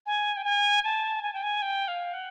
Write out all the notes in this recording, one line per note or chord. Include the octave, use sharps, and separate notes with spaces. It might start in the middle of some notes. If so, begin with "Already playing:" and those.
G#5
G5
G#5
A5
G#5
G5
G#5
G5
F5
F#5